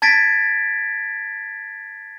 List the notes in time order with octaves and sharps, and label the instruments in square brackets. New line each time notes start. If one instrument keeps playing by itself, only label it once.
[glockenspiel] A5 G#6 A6 B6 D7